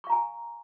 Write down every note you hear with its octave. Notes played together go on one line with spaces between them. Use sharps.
F5 G#5 A#5 C#6